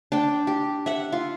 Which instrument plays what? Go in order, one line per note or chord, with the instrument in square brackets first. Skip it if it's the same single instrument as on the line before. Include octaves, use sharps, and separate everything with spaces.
[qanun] D4 G5
G4
E5 F#5
F4